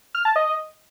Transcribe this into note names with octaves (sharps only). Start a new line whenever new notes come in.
F6
A5
D#5